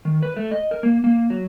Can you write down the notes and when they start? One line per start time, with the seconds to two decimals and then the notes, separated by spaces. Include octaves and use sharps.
0.05 D#3
0.23 B4
0.37 A3
0.51 D#5
0.71 A#4
0.83 A#3
1.04 A#3
1.30 F#3